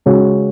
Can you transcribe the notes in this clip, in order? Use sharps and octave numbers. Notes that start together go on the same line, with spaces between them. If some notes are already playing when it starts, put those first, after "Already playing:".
C#3 G#3 C#4 F#4